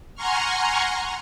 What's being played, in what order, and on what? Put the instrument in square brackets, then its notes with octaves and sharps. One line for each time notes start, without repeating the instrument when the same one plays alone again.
[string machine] F#5 G#5 A#5 C6 C#6 F6